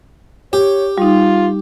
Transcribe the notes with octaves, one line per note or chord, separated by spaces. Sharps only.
G4 C#5
G3 D#4 F4